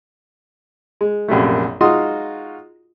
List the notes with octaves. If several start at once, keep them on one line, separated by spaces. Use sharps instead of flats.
G#3
A#1 F#2 C3 A3
G#3 D#4 F4 F#4 C6 D#6